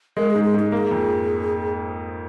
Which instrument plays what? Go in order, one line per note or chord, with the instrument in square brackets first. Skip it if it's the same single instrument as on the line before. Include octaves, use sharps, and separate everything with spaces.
[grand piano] G#3 [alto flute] A#4
[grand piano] G#2 [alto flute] G#4
[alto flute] G#4
[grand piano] G#2
[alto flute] G#4
[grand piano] A#3 [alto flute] G#4
[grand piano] F2